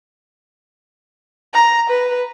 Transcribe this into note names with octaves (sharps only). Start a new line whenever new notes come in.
A#5
B4